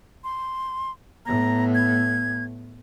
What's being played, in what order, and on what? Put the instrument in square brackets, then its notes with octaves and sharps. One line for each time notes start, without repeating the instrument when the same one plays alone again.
[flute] C6
[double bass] A2 B3 [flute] A#5
[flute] G#6